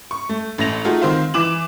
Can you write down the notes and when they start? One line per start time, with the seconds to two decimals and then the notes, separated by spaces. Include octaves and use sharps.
0.11 C#6
0.29 A3
0.58 A1 A3 A#6 F7
0.84 A3 D#4 F4 F#4 G#4
1.02 D#3 C4 C5 F5
1.34 E3 D6 E7 F#7